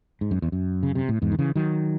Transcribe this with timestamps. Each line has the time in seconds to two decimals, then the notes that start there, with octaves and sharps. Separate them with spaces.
0.21 G#2
0.31 F#2
0.42 E2
0.52 F#2
0.83 C#3
0.95 C3
1.09 A2
1.22 E2 G#2
1.32 D#3
1.39 C#3 E3
1.56 D#3 F#3